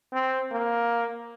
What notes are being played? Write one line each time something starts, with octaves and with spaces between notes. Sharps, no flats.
C4
A#3